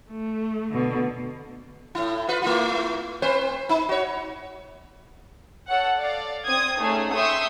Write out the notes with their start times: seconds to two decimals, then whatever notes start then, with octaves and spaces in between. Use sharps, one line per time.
0.11 A3
0.73 B2 D3
1.95 A2 E4
2.28 F4 B4
2.42 A3 E4 F4
3.22 C4 B4 C5
3.69 D#4
3.89 F#4 C#5
5.68 A4 C#5 F#5
5.98 D5 F5
6.45 C4 D#6 G#6
6.80 A3 C#4 D#4 G#4
7.13 E5 G5 C6 C#6 D#6 E6